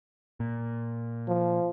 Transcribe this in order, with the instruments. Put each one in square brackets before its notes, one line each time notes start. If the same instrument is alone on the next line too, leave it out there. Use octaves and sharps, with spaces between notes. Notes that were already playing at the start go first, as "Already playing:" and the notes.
[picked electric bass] A#2
[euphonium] F3